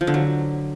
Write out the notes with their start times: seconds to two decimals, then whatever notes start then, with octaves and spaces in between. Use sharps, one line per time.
0.01 F3
0.07 D3
0.14 F#3